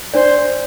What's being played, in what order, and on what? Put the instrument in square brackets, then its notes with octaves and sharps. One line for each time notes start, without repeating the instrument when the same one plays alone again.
[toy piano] D4 D5 [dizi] C5